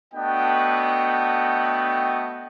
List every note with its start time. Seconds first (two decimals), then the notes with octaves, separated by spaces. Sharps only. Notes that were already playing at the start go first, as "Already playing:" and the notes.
0.13 A3 B3 D4 F#4 D#5 G5